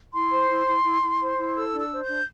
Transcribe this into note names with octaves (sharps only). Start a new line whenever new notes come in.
E4 C6
C5
E4
E4
E4
E4
C5
E4
A4 E6
D4
E6
C5
G6
D4